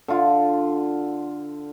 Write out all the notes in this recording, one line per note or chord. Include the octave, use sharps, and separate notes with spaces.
D3 F4